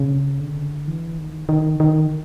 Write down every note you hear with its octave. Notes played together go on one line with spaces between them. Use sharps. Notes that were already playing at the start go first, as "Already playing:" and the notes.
Already playing: C#3
D3
E3
D#3
D#3
D#3